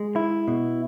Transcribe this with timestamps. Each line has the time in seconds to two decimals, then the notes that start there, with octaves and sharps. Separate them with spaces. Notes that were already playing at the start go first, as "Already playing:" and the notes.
Already playing: G#3
0.16 E4
0.48 B2